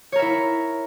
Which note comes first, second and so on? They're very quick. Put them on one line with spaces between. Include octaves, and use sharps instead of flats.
C#5 A#4 E5 E4